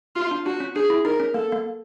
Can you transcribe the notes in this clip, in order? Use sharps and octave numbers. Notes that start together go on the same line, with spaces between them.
F4
D4
D4 F#4
C#4
D4 G#4
E4
D#4 A#4
C#4
A#3 A4
A#3